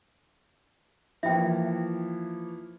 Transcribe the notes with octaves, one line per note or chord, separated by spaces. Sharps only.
E3 F3 A#3 E5 G5